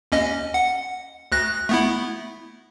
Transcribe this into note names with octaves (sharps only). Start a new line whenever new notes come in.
D#2 C#4 D#5
F#5
D2 F#6 A#6
A3 B3 E4